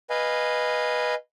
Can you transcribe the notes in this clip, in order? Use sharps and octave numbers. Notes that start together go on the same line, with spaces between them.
B4 D#5 F5 G#5